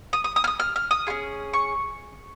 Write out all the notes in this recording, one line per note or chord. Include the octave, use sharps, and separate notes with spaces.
D#6
D#6
D#6
F6
D#6
F6
F6
D#6
C#4 F4 G#4
C#6